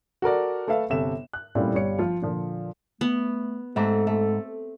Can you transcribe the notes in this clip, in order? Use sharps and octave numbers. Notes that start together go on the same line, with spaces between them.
F#4 A4 A#4 D5
A3 A4 B4 E5 F5
G1 C3 A4 E5 E7
F#6
A#2 G3 A3 C4 C#4 E4
G1 G3 C#5 C#7
F3 F4
A#2 D3 F3
A3 B3
G#2 A3 C4 G4 A4
A3